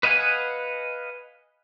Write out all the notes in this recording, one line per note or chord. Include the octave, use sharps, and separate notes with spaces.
B4 D#5 F5 F#5 G#5